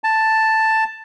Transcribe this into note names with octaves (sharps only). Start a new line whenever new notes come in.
A5